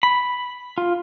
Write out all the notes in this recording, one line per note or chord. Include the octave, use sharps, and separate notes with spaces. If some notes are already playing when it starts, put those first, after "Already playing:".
B5
F4